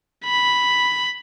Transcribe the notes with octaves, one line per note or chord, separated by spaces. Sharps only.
B5